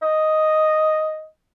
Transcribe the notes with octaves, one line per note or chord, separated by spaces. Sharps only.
D#5